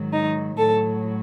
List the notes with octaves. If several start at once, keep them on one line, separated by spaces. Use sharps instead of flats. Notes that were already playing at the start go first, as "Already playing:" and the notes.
Already playing: G#2 D#3 F#3
D#4
A2 F#3 A4